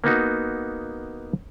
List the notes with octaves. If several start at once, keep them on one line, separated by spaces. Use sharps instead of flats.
A#3 B3 D#4 F#4